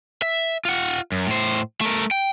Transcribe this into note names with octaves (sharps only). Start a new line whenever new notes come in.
E5
F4 F#5
F#2
A2 C5
A3 A#4
G5